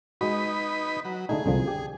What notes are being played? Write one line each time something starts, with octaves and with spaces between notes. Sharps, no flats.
G#3 D#4 F#4 B4 B5
F#3
D3 A3 D#4 G#4
C2 D3 F3
G4